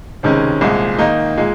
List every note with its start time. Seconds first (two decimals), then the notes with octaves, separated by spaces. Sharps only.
0.23 C#2 C3 D#3 G#3 C#4
0.61 C2 A#2 F3 G#3
0.99 D#3 A#3 D#4
1.37 A#2 G#3